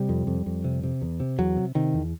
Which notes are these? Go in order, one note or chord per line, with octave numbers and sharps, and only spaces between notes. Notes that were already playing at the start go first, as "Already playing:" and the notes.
Already playing: C3 G3
F2
F2
F2
C3
C3
E2
C3
E2 F#3
C3
C3 D#3
E2